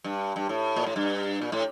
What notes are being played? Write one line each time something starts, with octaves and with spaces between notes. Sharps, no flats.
G2
G2
A2
A#2
A2
G2
A#2
A2